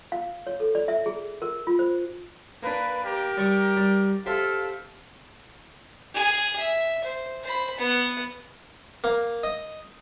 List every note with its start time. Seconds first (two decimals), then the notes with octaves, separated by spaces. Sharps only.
0.12 F5
0.47 C#5
0.60 A4
0.75 D5
0.88 E5
1.06 G#4
1.42 A#4
1.67 F4
1.79 C5
2.63 A#3 D4 B4
3.04 G4 A#4
3.37 G3 C#6 D#6
3.77 G3
4.26 G4 A4 C5 E5 F5
6.14 G#4 G#5
6.59 E5
7.04 C5
7.43 C5 B5
7.78 B3 F#5
9.04 A#3
9.43 D#5